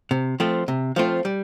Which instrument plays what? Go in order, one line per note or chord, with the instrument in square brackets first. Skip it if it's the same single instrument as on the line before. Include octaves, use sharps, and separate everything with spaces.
[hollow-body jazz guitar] C3
F3 A3 C4 F4
C3
F3 A3 C4 F4
G3